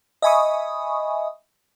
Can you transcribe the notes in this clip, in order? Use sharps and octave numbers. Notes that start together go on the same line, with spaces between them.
D#5 E5 G#5 B5 C#6 D#6